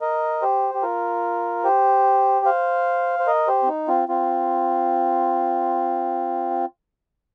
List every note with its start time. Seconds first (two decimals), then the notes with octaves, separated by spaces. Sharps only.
0.01 A#4 D#5
0.42 G4 C5
0.74 G4
0.82 F4 A#4
1.64 G4 C5
2.46 C5 F5
3.19 C5
3.27 A#4 D#5
3.48 G4 C5
3.63 C4
3.68 D#4
3.88 C4 F4
4.09 C4 F4